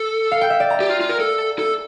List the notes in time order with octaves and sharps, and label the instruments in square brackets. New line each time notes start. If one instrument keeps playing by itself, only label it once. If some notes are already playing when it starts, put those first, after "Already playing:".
Already playing: [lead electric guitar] A4
[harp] F5
G5
E5
D5
A#5
[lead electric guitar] G4
F4
F4
A#4
A4
A4